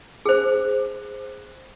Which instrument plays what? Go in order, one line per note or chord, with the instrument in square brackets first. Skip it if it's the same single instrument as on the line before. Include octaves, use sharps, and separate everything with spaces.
[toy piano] G#4 C5